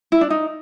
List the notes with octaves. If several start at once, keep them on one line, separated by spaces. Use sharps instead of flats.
E4
D4
D#4